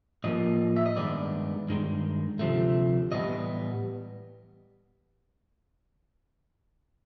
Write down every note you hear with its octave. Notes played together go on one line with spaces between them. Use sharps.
A2 F3 A#3 D#5
E5
D#5
G2 D#3 G#3 B3 D5
G2 D#3 G#3
D2 C3 F3 A3
A2 E3 G3 B3 D#5